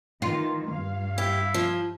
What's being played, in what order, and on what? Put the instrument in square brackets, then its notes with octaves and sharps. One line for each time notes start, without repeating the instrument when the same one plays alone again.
[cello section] D#3 E3 [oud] F4
[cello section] G2 F5
[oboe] E4 [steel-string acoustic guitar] G4
[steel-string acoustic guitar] F3